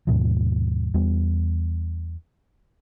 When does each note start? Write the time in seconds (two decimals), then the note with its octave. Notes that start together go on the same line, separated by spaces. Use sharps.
0.07 D#2 G#2 B2 F3
0.94 E2 G3 B3